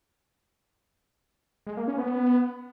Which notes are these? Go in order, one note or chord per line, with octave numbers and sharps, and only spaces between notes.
G#3
A#3
C#4
B3